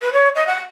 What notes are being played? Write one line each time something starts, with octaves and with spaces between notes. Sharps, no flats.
B4
C#5
D#5
F#5